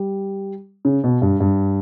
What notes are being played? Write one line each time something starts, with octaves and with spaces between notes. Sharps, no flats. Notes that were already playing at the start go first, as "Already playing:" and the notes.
Already playing: G3
C#3
B2
G2
G2